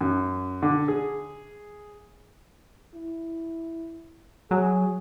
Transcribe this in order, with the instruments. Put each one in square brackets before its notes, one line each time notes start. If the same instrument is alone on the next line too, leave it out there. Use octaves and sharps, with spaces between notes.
[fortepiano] F#2
D3
G#4
[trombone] E4
[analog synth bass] F#3 [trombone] G#4